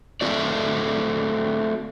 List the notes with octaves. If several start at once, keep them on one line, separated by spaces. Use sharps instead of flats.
A3 C4 F#4 D5